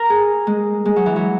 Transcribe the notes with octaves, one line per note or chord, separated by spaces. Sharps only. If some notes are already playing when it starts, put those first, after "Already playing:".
Already playing: A#4
G#4
G#3
G#3
F#3
E3
F#3